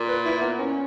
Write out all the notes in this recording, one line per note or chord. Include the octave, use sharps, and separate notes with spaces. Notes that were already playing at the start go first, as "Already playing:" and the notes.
Already playing: A#2
B4
E4
B3
C#4